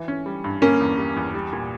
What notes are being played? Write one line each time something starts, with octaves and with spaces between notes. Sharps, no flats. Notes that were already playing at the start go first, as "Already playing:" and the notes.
Already playing: E3
C#4
G3
G2
D3 A#3 C#4
E2
G3
E2
G3
A#2